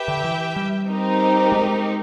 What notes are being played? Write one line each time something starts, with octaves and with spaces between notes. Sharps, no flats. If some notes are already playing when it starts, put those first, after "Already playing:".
Already playing: G4 B4 E5 G5
D3
E3
G3
C4 D#4 G4 A#4
G#3